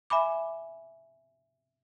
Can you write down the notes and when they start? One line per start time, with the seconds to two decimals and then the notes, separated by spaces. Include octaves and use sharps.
0.10 E5 G#5 B5 D6